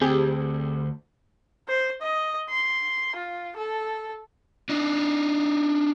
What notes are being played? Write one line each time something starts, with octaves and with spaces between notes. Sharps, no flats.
D2 C4 G4 G#4
C5
D#5
C6
F4
A4
D4 D#4